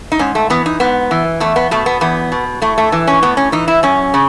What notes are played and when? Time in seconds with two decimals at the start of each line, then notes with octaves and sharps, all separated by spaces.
0.12 D#4
0.19 G#2 C#4
0.35 A3
0.50 E3 B3
0.66 D#4
0.80 G#2 B3
1.11 E3
1.40 E2 A3
1.56 B3
1.71 B2 A3
1.86 B3
2.01 E2 B3
2.32 B2
2.62 A2 A3
2.78 A3
2.92 E3
3.07 C#4
3.23 A2 B3
3.37 C#4
3.52 E3 D#4
3.68 E4
3.83 F#2 C#4
4.14 C#3